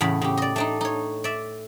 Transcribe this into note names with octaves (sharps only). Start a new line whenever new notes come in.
E2 A2 C#3 B5
C#3 G4
D5 D#5
A3 D4 D#4
D#4 C#5
D5 E5